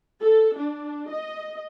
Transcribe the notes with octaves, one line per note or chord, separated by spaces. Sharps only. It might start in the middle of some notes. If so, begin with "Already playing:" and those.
A4
D4
D#5